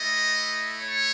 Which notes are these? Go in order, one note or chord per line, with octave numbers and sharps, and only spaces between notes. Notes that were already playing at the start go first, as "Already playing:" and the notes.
Already playing: A3 E4 D#5
C#5